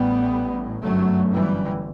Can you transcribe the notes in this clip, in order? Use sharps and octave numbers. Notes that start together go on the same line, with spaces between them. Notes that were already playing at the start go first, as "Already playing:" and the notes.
Already playing: A1 A2 G3 B3
G1 F#2 F#3 A3
E3 G3